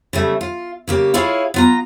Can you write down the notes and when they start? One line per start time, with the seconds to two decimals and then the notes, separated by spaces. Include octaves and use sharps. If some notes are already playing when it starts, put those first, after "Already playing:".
0.13 C#3 G3 A3
0.41 F4
0.88 C#3 A#3 G4
1.14 E4 F4 G#4 C#5 F5
1.54 B3 F4 A#5